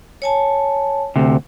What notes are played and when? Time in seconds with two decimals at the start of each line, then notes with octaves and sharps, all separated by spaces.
0.22 C#5 G#5 A5
1.16 D2 C3